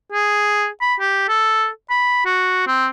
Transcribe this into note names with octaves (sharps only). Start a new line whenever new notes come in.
G#4
B5
G4
A4
B5
F#4
C4